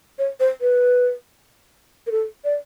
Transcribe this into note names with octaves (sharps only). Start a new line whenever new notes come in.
C#5
C5
B4
A#4
A4
D5